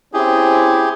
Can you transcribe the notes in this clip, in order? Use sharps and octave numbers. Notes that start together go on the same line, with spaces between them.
C4 C#4 E4 G4 G#4